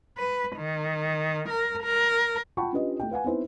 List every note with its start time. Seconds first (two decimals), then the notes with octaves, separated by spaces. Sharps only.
0.17 B4
0.56 D#3
1.50 A#4
1.83 A#4
2.57 F4 F#5 G5 A5 B5 C#6
2.73 C#4 D4 F4 G4 B4 D#5
3.00 A3 G5
3.11 B4 F5 F#5 G#5
3.24 B3 C4 D#4 E4 B4 C5